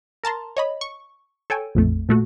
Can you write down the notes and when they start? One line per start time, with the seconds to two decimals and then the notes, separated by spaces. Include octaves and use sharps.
0.24 A#4 A5 A#5 C6
0.57 C#5 D#5 B5
0.81 C#6
1.50 A4 C#5 G5 G#5
1.75 A#1 F2 A3
2.09 A#2 A3 F#4